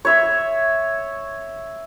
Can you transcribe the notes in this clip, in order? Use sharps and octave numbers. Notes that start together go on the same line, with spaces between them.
C#5 E5